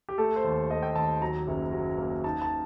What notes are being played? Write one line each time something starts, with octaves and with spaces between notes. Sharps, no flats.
G4
A3 A4
C5
D#2
A3 D#5
G5
D#2 A5
F#3 A#5
F#1
F#3
A#3
D#4 A5
A5